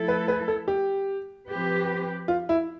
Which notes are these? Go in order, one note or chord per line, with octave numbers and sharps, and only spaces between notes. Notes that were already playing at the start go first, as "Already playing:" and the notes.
Already playing: F3 A3 E4 A4
B4
B4
A4
G4
F3 C4 G4 B4
F4
E4